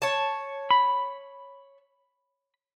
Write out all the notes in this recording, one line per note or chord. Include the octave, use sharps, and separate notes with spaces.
C#5 A5
B5